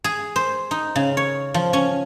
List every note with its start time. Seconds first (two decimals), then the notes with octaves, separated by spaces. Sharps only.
0.04 G#4
0.36 C5
0.71 D#4
0.96 C#3
1.17 C#5
1.54 F3
1.73 C#4